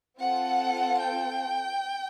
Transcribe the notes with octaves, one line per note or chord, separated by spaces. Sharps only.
C4 F4 A4 F#5
G5